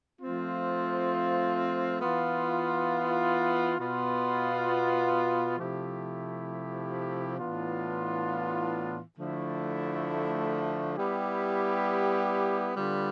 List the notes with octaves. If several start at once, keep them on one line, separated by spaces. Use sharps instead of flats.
F3 A3 C4 F4
E3 B3 F4
B2 B3 F4
C3 F3 A3 E4 G4
A2 E3 B3 D4 F4
D3 F3 A3 E4
G3 B3 E4 G4
D3 G3 B3 F4